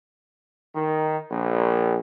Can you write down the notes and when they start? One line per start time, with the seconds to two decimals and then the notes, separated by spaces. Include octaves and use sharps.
0.75 D#3
1.31 A#1